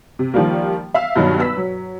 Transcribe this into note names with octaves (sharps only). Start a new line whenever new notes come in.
C3
D#3 F3 G3 A#3
E5 F5 E6
G2 B2 D#3 F#3 D#4
B4 E6 B6
F#3